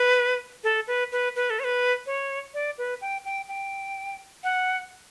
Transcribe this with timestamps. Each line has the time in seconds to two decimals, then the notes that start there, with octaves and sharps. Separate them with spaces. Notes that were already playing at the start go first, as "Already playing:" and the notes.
Already playing: B4
0.64 A4
0.87 B4
1.12 B4
1.36 B4
1.50 A4
1.59 C#5
1.64 B4
2.06 C#5
2.54 D5
2.78 B4
3.01 G5
3.25 G5
3.48 G5
4.44 F#5